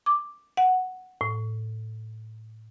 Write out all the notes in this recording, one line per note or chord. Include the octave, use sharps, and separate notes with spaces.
D6
F#5
A2